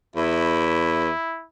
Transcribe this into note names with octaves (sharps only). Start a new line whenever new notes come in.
E2 E4